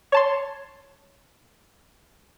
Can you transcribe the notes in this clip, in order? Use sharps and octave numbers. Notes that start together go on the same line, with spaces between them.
C#5 A5 C6